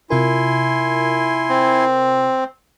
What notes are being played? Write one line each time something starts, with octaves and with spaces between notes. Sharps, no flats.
C3 E4 F4 A#4 G#5 C6
C4